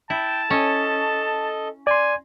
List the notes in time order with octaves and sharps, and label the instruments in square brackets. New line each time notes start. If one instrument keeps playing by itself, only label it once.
[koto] E4 [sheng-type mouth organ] G5 [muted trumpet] A5
[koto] C#4 [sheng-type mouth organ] A4 D#5
[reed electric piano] D5 C6 [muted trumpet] G#5